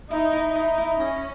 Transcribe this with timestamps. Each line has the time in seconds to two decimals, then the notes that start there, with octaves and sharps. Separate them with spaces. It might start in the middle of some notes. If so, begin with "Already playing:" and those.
0.10 D#4 E4
0.33 E4
0.54 D#4 E4
0.78 E4
1.00 C#4 D#5